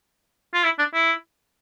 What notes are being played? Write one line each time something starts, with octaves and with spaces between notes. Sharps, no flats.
F4
E4
D4
E4